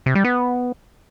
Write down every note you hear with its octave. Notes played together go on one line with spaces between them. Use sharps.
C3
G3
B3